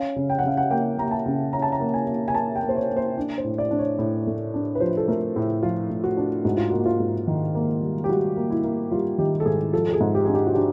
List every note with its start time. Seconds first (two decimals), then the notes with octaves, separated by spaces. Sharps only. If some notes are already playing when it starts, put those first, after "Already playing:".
Already playing: C#4 F5
0.16 C#3
0.30 G5
0.39 F#5
0.44 C#3 F5
0.57 F#5
0.70 A#3 G5
0.98 A#3 A#5
1.11 A5
1.26 C#3
1.53 C#4 A#5
1.62 A5
1.72 A#5
1.80 A#3
1.94 G#5
2.07 A#3
2.28 G#5
2.34 A#3 A5
2.56 G5
2.62 A#3
2.69 C5
2.76 C#5
2.90 A#3
2.96 C5
3.17 D4
3.38 C5
3.44 A2
3.58 D5
3.71 D4
3.79 C#5
3.99 A2
4.27 A3
4.54 D4
4.75 B4
4.80 F3 C5
4.97 A4
5.08 A3 A#4
5.35 A2 G#4
5.63 F3 F4
5.90 A2
6.04 F#4
6.17 D4
6.45 G#2 F#4
6.57 F4
6.70 A#3 F#4
6.86 F4
7.00 G#2
7.27 D#3
7.55 A#3
7.82 G3
8.04 G4
8.09 G3 F#4
8.36 A#3
8.50 E4
8.64 A#3
8.92 G3 F4
9.18 D#3 G4
9.40 A4
9.46 G#2 G#4
9.73 F3 A4
9.89 A4
9.93 G#4
10.00 G#2
10.15 G4
10.25 D4 G#4
10.34 G4
10.47 F#4
10.55 D4 G4